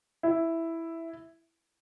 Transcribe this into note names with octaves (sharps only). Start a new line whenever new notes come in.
E4